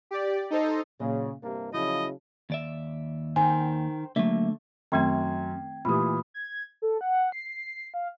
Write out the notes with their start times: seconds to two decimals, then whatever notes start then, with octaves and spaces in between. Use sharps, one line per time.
0.11 G4 D5
0.50 D#4 A4 C5 D#5
1.00 A#2 C#3 F#3 D#5
1.43 G2 C3 A#3 D4
1.74 C#3 F3 F#3 E4 D#5
2.50 D#2 D5 E5
3.36 D#3 C5 G5 G#5
4.16 D3 F#3 A3 A#3 E5
4.92 F#2 D#3 A3 C4 G5 C6 G#6
5.85 A#2 E3 A3 G4 B5 D#6
6.34 G#6
6.82 A4
7.01 F#5
7.32 C7
7.48 C7
7.94 F5